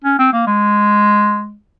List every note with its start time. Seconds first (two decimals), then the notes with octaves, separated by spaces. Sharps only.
0.04 C#4
0.19 C4
0.33 A#3
0.47 G#3